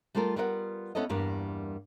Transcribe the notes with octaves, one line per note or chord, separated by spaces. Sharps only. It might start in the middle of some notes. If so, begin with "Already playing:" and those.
G3 A3 F4 A4 A#4
G3 B3 F4 A#4 D#5 F#5
B3 C#4 E4 A4 D#5
E2 G2 G3 A#3 A#4